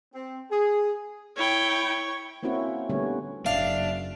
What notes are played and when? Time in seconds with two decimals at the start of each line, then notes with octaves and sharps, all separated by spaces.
0.14 C4
0.52 G#4
1.37 E4 C#5 G5
2.43 A#3 C4 C#4 E4 F#4
2.90 D3 G3 A3 B3 C#4 C#5
3.46 F#1 D4 E5 F5